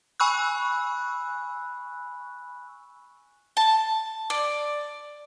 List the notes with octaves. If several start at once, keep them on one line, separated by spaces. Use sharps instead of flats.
G#5 B5 C#6 E6 F#6
A5
D5